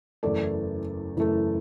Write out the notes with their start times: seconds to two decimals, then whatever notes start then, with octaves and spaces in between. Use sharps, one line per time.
0.23 F#1 E2 E3 A3 A4 D5
1.17 F#1 E2 E3 A3